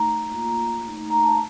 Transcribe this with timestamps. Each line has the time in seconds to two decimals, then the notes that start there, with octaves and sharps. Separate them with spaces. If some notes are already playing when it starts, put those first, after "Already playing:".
Already playing: A3 D#4 A#5
0.31 A#3 F4
0.84 A3 D#4
1.10 A#5
1.24 A5